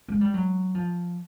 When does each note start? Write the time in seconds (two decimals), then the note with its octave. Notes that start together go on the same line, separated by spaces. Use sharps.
0.08 G#3
0.21 G3
0.34 F#3
0.75 F3